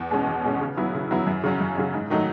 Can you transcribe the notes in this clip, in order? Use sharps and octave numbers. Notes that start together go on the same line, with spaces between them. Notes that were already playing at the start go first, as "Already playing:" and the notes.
Already playing: E2
B2 G#3 C#4
E2
B2 G#3 C#4
C#3
F#3 B3 E4
C#3
F#3 B3 E4
F#2
C#3 F#3 C#4
F#2
C#3 F#3 C#4
G#2
D#3 F#3 A3 D#4